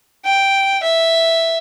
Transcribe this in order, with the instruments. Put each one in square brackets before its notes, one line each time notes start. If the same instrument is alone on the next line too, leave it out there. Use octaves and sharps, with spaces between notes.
[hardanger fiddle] G5
E5